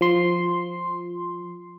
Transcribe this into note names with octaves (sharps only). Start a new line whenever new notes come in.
F3 C6